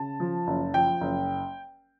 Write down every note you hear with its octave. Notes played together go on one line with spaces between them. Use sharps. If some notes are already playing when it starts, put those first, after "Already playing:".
Already playing: C#3 A5
F3
F#1
F3 G5
F#1